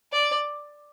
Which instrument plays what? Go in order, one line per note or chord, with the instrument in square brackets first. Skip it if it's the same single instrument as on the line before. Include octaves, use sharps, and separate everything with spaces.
[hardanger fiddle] D5